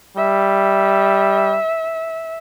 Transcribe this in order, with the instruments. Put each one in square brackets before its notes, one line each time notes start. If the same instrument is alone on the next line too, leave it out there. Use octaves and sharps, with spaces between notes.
[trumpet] G3 [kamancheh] E5